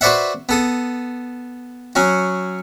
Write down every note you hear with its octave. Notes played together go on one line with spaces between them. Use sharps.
F#4 B4 C5 D5 E5 F#5
B3 A4 D#6
F#3 C#4 F#4